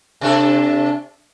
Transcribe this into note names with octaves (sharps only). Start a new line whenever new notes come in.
C3 D4 A4